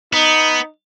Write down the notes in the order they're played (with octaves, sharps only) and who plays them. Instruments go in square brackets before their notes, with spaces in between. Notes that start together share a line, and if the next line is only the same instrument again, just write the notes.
[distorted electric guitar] B3 [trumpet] D#4